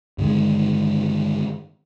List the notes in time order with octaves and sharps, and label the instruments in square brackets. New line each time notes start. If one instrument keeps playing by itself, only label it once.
[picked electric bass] G2 D3 D#3 G#3